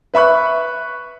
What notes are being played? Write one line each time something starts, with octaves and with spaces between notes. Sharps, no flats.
B4 E5 B5 C#6 F#6